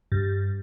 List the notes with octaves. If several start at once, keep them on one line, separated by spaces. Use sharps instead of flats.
G2